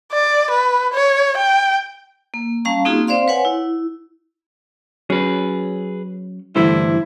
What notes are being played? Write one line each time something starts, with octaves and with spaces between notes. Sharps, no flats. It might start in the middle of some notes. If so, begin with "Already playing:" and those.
D5
B4
C#5
G5
A#3
G3 C#4 F5 A5 A#5 C#6
A#3 C4 D#4 F4 F#4 G#4
C4 C5 D5 F5 C6
B4 C#5 F#5 G#5
E4
F#3 C#4 G#4 B4
G2 D3 E3 G3 A3 E4 C5